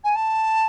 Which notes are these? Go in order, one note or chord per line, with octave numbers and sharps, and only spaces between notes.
G#5
A5